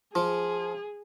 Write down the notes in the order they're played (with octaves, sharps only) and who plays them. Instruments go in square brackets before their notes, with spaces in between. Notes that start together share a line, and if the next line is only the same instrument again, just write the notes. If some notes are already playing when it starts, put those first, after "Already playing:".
[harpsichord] F3 [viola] G#4